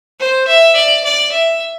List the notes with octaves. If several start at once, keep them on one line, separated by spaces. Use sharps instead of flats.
C5
E5
D5
D5
E5